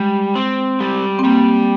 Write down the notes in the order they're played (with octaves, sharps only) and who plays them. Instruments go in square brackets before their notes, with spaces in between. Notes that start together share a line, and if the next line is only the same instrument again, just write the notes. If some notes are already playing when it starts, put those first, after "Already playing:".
Already playing: [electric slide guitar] G3 [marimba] G#3
[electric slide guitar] C4
G3
[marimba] C4
[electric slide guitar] G3 [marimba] A#3